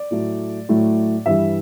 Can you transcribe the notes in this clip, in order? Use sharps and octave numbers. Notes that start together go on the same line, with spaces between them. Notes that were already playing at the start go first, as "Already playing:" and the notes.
Already playing: D5
A2 F#3 A3
A2 F#3 A3
G2 E3 G3 E5